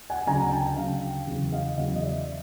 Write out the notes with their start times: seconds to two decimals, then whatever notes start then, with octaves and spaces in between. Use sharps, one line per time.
0.10 F#5 G#5
0.26 D2 C#3 F#3 G#5 A#5
0.52 G5 A5
0.76 D2 C#3 F#3 F5 G5
1.27 E2 C#3 F#3
1.52 D#5 F5
1.77 E2 C#3 F#3 D#5 F5
1.95 D#5
2.02 D5 E5